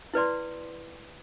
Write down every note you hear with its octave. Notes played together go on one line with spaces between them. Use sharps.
E4 B4 D5 C6